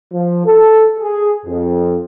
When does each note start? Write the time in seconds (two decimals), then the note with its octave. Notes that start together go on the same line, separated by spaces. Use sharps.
0.14 F3
0.46 A4
0.99 G#4
1.46 F2